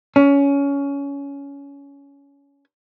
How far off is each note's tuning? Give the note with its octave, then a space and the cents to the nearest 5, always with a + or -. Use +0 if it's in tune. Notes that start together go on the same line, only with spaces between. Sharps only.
C#4 +20